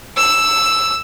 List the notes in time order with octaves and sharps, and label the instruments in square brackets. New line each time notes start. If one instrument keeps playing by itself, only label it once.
[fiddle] E6